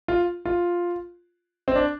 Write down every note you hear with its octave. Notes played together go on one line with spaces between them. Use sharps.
F4
F4
C4
D4